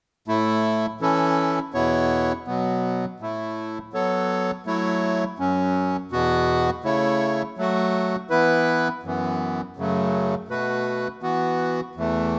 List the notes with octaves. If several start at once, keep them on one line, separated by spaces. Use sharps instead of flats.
A2 A3 E4
E3 C#4 E4 A4
E2 B2 B3 E4 C#5
B2 F#3 B3
A2 A3 E4
F#3 B3 A4 C#5
F#3 A3 E4 C#5
F#2 F#3 C#4
E2 B2 B3 F#4
C#3 A3 E4 C#5
F#3 A3 F#4
E3 B3 E4 B4
F#2 E3 B3
F#2 C#3 F#3 A3
B2 A3 F#4 B4
E3 B3 F#4
E2 E3 A3